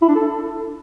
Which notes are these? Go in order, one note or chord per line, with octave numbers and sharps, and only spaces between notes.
E4
D4
A4